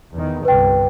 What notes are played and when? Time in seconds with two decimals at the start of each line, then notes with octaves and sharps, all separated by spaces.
0.14 E2 D#3
0.45 G1 C2 G2 B4 G5